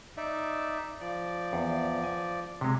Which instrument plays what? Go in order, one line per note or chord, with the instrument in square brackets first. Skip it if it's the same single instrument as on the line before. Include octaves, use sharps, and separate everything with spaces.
[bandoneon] D#4 D5 E5
F3 D5
[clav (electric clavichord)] E2
G#5
C3 G#3